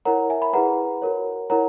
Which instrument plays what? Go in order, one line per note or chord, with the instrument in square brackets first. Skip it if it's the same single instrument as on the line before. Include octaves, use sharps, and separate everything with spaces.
[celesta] E4 A#4 C#5 F#5 A#5
E5 G#5
B5
E4 G#4 B4 F#5 A#5
F#4 A#4 C#5
E4 A#4 C#5 F#5 A#5